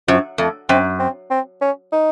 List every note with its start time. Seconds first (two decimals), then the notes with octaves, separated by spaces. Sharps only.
0.08 F#2 F3
0.38 F2 A3
0.69 F#2 C4
1.00 C4
1.31 C4
1.61 C#4
1.92 D#4